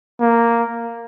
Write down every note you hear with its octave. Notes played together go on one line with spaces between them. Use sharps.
A#3